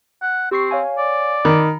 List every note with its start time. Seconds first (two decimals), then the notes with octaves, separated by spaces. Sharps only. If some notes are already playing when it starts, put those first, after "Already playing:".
0.22 F#5
0.51 C4 G4 C#6 C7
0.71 C#5 F5 G#5
0.98 D5
1.45 D#3 B5